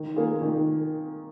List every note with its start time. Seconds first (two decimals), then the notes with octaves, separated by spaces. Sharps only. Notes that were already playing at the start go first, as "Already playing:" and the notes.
Already playing: D#3
0.16 A#3 F4 G#4
0.42 D#3